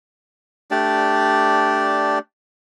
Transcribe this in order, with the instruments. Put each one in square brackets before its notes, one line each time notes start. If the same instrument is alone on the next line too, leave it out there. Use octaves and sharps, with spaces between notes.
[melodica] A3 D4 G4 D5